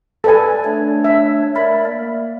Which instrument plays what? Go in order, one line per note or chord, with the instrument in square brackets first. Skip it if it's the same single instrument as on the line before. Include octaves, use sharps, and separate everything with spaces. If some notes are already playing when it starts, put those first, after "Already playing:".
[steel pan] A4 B4 G#5 [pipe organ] D5
[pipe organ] A3 D4 C#5
[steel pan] E5
[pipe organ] A#4 D5 E5 [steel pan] B5
[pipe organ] A#3